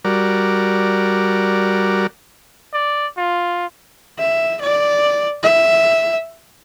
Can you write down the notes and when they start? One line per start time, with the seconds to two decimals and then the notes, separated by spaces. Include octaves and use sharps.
0.05 G3 F#4 A#4 D5
2.73 D5
3.17 F4
4.19 E5
4.61 D5
5.43 E5